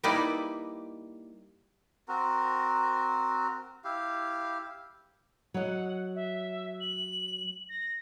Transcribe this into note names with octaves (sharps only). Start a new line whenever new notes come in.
G3 A#3 D#4 E4 B4 D5
C4 F#4 A#4
E4 G4 F5
F#3 D#5 F#5
E5
F#7
A#6